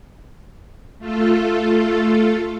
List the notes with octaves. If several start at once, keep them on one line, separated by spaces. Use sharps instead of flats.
A3 F4 A4